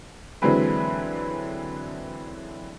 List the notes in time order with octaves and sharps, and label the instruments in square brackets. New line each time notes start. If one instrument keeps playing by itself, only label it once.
[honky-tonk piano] D3 E3 F#3 G#3 C4 B4